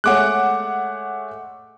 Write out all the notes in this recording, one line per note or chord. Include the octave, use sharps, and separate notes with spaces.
G#3 A3 C#5 F#5 D6 F#6